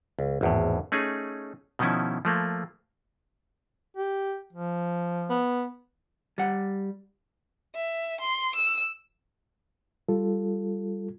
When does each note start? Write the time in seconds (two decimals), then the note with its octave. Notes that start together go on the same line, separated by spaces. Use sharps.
0.19 C#2
0.41 G#1 E2 A2
0.92 A3 C#4 D#4 G#4
1.79 B2 D#3 F3 C#4 E4
2.25 F3 A3 A#3
3.97 G4
4.53 F3
5.29 B3
6.38 G3 F#5
7.75 E5
8.20 C6
8.55 E6
10.09 G3 F4 A4